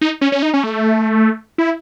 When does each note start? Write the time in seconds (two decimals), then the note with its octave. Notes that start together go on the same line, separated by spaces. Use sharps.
0.01 D#4
0.21 C#4
0.32 C#4
0.42 D#4
0.54 C#4
0.64 A3
1.58 E4